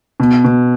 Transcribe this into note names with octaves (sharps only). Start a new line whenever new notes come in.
B2
B2